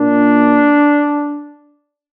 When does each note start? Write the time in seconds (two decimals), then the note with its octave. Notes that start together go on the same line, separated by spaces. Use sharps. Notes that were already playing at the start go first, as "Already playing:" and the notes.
Already playing: A#2 A#3 D4